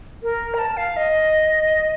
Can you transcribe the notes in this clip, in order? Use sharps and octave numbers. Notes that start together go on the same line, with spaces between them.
A#4
A#5
A5
F5
D#5